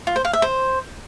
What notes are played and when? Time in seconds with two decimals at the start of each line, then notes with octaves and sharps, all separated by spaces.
0.07 F4
0.16 C5
0.25 F5
0.33 E5
0.42 C5